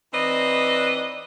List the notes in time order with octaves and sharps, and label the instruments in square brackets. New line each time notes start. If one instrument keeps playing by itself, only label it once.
[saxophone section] E3 C4 D#4 B4 D5 D#5